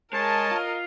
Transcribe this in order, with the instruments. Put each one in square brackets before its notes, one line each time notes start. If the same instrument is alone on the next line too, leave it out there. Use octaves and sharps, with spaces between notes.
[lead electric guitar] G#3 [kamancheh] A#4 D#5 [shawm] C#5 [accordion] A5
[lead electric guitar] F4